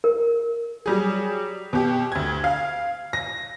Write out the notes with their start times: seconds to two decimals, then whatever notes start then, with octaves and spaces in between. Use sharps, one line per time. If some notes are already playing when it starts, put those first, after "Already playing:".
0.04 A#4
0.86 F#3 G3 G#4
1.73 B2 G4
2.12 D2 G#6
2.44 F5
3.13 A#6